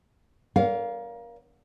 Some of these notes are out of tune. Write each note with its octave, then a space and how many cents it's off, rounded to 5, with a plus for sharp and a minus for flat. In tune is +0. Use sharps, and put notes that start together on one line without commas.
A#4 +25 D5 -45 F5 +0